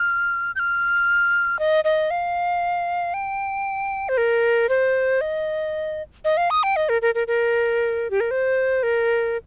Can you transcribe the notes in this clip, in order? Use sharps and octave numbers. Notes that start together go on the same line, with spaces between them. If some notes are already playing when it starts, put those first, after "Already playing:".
Already playing: F6
G6
F6
D#5
D#5
F5
G5
C5
A#4
C5
D#5
D#5
F5
D#6
G5
D#5
A#4
A#4
A#4
A#4
G4
A#4
C5
A#4